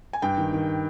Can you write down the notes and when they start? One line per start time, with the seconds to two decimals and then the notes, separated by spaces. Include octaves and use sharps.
0.13 G#5
0.22 G2 G5
0.38 D#3
0.53 D#3